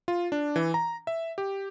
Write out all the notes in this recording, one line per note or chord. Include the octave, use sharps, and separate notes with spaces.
F4
D4
E3
A#5
E5
G4